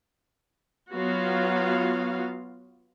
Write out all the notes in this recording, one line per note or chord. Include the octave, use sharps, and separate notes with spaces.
F#3 B3 F4 F#4 F5